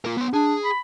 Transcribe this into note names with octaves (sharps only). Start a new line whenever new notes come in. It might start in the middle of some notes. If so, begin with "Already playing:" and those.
F4 A#4
B3 C6
D4 G#4
B5